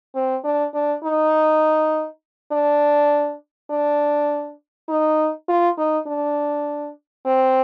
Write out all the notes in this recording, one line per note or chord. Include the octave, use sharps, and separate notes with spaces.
C4
D4
D4
D#4
D4
D4
D#4
F4
D#4
D4
C4